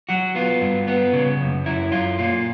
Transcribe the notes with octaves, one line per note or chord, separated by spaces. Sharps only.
F#3 F#4
B3 F4
G2
B3
C#3
F#2
F#2 E4
F#2 F4
A#2 F4